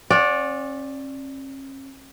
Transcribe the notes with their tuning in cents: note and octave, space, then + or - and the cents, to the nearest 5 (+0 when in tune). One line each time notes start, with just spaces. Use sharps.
C#4 -40 D5 +0 F#5 -25